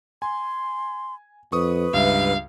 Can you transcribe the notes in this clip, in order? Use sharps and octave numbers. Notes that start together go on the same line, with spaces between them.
G#5 C6
F2 B4 C#6 D#6
C#2 G2 E5 F5